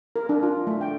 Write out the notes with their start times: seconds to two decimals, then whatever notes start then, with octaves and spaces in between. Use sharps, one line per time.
0.16 A#4
0.29 D4
0.43 F4
0.67 A3
0.81 G5